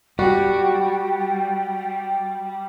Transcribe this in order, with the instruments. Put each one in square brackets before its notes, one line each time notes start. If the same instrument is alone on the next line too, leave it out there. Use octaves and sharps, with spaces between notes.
[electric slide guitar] G3 [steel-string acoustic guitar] F#4 [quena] G5